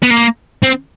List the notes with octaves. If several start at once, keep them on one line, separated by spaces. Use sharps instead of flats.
B3
A#3
C4